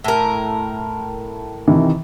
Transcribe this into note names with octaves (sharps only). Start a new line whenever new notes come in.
A2 A#4
C3 D#3 E3